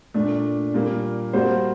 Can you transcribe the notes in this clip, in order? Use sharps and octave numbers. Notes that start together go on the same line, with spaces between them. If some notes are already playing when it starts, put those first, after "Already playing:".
A#2 A3 D4
A#2 G3 A#3
G3 A#3 F#4 C5